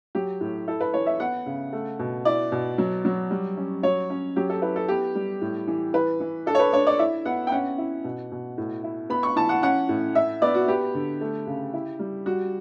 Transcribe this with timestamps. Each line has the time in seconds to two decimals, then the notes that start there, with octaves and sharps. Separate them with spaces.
0.15 F#3 G4
0.41 A2
0.68 E4 A4
0.81 B4
0.94 E3 C#5
1.06 E5
1.20 B3 F#5
1.46 C#3
1.73 A3
1.99 B2
2.25 E4 D5
2.52 B2
2.78 F#3
3.05 F#3
3.31 G3
3.57 C#4
3.83 F#3 C#5
4.10 C#4
4.36 F#3 G4
4.50 A4
4.62 E4 B4
4.76 A4
4.88 B3 G4
5.15 G3
5.41 A2
5.67 E3
5.94 E3 B4
6.20 E3
6.46 D4 A4
6.55 C#5
6.59 B4
6.73 D4 C#5
6.87 D5
6.99 E4 E5
7.25 B3 F#5
7.47 G5
7.52 C#4 F#5
7.78 E4
8.04 B2
8.31 B2
8.58 A2
8.84 E4
9.10 B3 B5
9.23 C#6
9.36 E3 A5
9.49 F#5
9.62 C#4 F#5
9.89 A2
10.15 E4 E5
10.42 B3 D5
10.54 F#4
10.68 B3 G4
10.95 D3
11.21 A3
11.47 C#3
11.73 E4
11.99 G3
12.26 G3 F#4